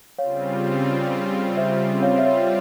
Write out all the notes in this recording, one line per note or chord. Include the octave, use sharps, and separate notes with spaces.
C#3 G3 C4 F4 C#5 F5
C5 E5
G3 C4 F4 C#5 F5
E5
C#5